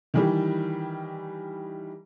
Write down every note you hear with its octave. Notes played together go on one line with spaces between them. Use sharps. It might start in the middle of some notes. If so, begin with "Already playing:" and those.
D#3 E3 G3